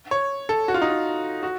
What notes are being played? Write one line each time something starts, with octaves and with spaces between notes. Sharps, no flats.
C#5
A4
F#4
F4
D#4
F4
F#4